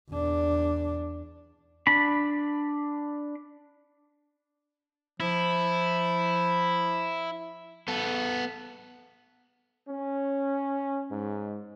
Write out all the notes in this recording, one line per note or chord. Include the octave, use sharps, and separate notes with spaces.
E2 D4
D4 B5
F3 E4
B3 A4
C#4
G#2